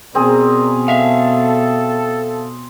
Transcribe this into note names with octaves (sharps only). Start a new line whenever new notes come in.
B2 C4 G#4 A#4 D5 A#5
A4 E5 F5